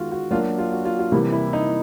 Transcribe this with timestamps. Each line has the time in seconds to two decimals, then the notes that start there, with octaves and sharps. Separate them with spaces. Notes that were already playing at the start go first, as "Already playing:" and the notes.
Already playing: D#3 G#3 B3 F4 F#4
0.12 F#4
0.31 F#3 A#3 D4 F4 F#4 A#4
0.58 F4
0.72 F#4
0.85 F4
0.99 F4
1.12 C3 E3 G3 A#3 E4
1.32 E4
1.53 D#4